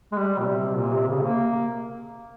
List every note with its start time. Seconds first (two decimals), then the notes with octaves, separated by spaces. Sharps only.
0.12 G#3
0.17 G3
0.39 A#2
0.47 C3
0.77 A#2
0.93 C3
1.08 C#3
1.23 A#3